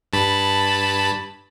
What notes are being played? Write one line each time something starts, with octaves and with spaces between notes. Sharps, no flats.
G2 A5 B5